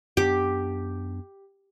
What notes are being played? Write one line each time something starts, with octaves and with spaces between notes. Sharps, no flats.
F#2 B3 D4 G4